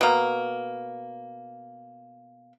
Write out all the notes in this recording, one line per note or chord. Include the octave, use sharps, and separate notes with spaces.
B2 A#3